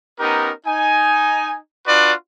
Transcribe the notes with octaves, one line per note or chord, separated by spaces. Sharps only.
B3 C#4 D#4 G4 A#4
D#4 G#5
D4 F4 F#4 B4 D5